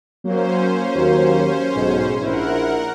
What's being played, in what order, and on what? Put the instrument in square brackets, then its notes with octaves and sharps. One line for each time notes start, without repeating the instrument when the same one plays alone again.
[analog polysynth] F#3 A#3 [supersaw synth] C#4 C5
[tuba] D#2
[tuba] B1 [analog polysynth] G#2
[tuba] A#1 [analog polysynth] E4 [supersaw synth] A#4 F#5